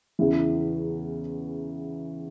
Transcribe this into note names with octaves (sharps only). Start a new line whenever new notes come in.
E2 C#3 E3